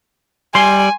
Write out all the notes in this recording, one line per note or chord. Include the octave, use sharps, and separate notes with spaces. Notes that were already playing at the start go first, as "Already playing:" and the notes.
G3 G#5 C6